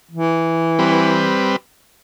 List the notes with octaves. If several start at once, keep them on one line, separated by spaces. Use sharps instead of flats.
E3
G3 C4 B4